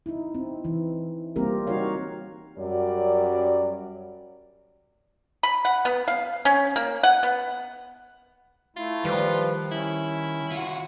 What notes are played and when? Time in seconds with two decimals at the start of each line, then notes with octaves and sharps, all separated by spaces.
0.06 D#4 E4
0.35 C4
0.64 E3 E4
1.36 G3 A#3 C4 F4 G4 A#4
1.67 D#4 F#4 A#4 C#5 F5
2.58 F#2 F#3 G3 D5
5.43 B5
5.65 F#5
5.85 B3
6.08 F5
6.45 C#4
6.76 A#3
7.03 F#5
7.23 B3
8.76 A3 E4 F4
9.05 D#3 F3 G3 B4
9.72 C#4 E4
10.52 F4 F#4